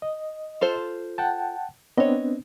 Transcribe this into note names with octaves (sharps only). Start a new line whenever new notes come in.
D#5
F4 A4 C5
F#5 G5 A5
B3 C4 D4 C#5 D#5